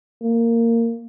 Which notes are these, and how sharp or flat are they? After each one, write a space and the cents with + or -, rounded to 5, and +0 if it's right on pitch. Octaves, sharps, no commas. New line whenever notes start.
A#3 -15